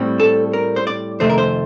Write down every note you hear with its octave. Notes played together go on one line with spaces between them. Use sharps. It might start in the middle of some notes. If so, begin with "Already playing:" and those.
Already playing: A2 G3 C4
A4
A#4
C5
D5
F2 C3 D#3 A3 C5
A#4
C5